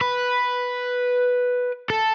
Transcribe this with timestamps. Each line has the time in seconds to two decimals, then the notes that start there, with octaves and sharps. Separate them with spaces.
0.01 B4
1.90 A4